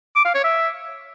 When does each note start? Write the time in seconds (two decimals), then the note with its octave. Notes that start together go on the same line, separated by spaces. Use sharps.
0.16 D6
0.25 F5
0.35 C#5
0.44 E5